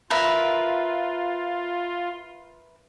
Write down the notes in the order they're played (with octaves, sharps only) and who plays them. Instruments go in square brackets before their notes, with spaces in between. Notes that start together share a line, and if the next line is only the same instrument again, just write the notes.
[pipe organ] F4 [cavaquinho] A#4 B4 E5